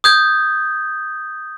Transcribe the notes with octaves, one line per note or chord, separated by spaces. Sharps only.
D#6 G6 G#6